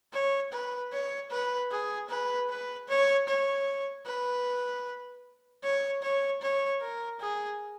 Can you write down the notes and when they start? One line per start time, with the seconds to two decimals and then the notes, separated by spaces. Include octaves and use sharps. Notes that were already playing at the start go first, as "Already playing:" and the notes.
0.13 C#5
0.52 B4
0.92 C#5
1.31 B4
1.71 G#4
2.09 B4
2.49 B4
2.88 C#5
3.28 C#5
4.06 B4
5.63 C#5
6.02 C#5
6.41 C#5
6.81 A#4
7.20 G#4